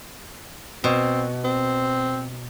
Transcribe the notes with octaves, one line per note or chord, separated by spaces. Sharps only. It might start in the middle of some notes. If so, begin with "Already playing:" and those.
B2 C4
C4